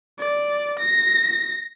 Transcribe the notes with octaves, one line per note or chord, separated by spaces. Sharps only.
D5
A#6